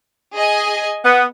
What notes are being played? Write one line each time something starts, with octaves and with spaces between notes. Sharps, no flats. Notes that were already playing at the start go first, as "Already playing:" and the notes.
G#4 D#5 G#5
B3